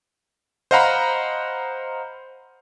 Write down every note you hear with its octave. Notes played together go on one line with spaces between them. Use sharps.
C5 D#5 F5 F#5 A#5 B5